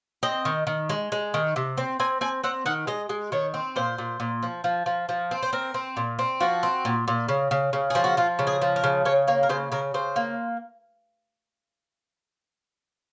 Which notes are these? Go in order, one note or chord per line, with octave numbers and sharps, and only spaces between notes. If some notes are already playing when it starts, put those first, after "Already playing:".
C4 D#5
D#3
D#3
G#3
G#3
D#3
C3
C4
C4 G#5
C4 G#5
C4 F#5
D#3 F#5
G#3 D#5
G#3
D#3 C#5
C4
A#2 C5
A#2
A#2
F3
F3
F3
F3
C4
C5
C4 A#4
C4
A#2
C4
F3 F#4
C4
A#2
A#2
C#3
C#3
C#3
F3 G#4
F#4
F3 F4
C#3
G#4
F3
A#4
C#3
C#3 C#5
A#3 C#5
A#4
C#3 C5
C#3 A#4
C#3 C5
A#3